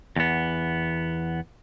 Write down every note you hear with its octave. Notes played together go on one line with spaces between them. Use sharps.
E2 B3